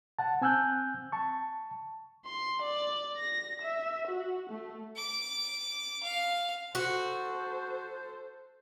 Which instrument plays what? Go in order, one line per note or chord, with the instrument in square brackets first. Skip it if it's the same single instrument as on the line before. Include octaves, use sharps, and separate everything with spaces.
[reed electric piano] F#5 A5
C4 G#5 E6 F#6 G6
A5 C#6
[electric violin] C6
D5
A#6
E5
F#4
A3
[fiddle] D6
F5
[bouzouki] F#4 [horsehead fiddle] A4 C5